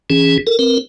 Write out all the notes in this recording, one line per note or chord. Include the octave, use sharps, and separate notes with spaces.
E3 C#4 G#4
A4 A#4
C4 A#4 B4